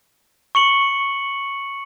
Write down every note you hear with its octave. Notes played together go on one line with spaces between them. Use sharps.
C#6 C#7 F#7